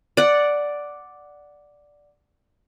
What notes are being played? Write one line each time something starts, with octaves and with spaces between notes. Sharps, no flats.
D5 F#5